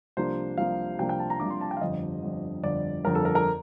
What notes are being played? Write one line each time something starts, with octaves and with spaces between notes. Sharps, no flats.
C2 C3 F3 A#3 D4 C5
C2 C3 F3 A#3 D4 F5
C2 C3 F3 A#3 D4 G5
G5
A5
A#5
C2 C3 F3 A#3 D4 D6
C6
A5
G5
F5
G1 F2 D3 D#5
G1 F2 D3
G1 F2 D3 D5
G1 F2 D3 A#4
A4
A#4
A#4